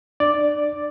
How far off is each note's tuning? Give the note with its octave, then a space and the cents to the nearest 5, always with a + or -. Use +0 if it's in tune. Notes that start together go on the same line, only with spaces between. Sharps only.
D4 +40 D5 +0